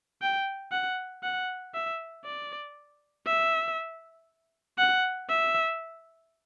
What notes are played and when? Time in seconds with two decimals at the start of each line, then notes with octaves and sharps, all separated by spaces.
0.22 G5
0.72 F#5
1.23 F#5
1.74 E5
2.25 D5
3.26 E5
4.78 F#5
5.29 E5